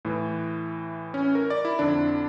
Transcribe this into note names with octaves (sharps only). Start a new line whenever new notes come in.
A2 E3
C#4
A#4
D5
E4
F2 D3 D4